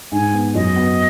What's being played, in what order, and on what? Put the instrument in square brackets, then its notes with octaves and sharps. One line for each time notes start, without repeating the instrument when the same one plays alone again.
[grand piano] G#2 [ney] G#5
[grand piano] B3
[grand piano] F#2 [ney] D#5
[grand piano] B3